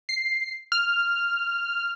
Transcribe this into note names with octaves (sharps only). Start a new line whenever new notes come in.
C7
F6